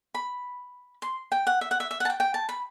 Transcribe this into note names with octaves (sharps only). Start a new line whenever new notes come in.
B5
C6
G5
F#5
E5
F#5
E5
E5
F#5
A5
G5
G5
A5
B5